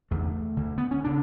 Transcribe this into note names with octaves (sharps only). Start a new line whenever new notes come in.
E2 D3 A3
D2 D3
B3
C#4
C#3 D4